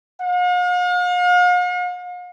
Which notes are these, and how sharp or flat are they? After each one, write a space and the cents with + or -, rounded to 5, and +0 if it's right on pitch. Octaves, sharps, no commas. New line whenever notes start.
F5 +45